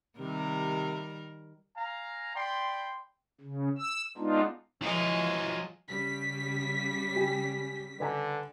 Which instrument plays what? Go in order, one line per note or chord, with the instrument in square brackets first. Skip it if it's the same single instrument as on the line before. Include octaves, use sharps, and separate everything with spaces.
[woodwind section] C3 C4 [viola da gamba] D#3 G3 A#4
[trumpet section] F5 G#5 A#5
D5 G5 B5 C6
[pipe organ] C#3
E6
G#3 B3 D4 D#4 F4
[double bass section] F3 [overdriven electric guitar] F#3 F4 [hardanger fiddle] G#3 D#5 [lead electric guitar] E4 B4
[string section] C#3 G3 B6
[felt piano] G4 G5 G#5
[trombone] D3 [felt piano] B4 G#5 A#5